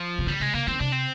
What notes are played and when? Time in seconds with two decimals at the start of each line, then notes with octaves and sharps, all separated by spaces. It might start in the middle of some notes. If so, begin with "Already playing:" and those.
Already playing: F3
0.19 C3
0.27 D3 G3
0.40 C3 G#3
0.54 C3 A#3
0.67 D#3 C4
0.79 C3 D4
0.92 C4